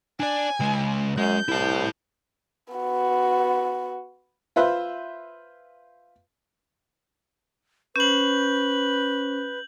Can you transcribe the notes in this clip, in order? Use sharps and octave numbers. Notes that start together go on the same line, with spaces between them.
D4 D5 G#5
C#2 G#3
F#2 G#3 G6
C2 E4 A5
B3 F#4
F4 B4 C5 E5
C#4 B4 C5 G6 F#7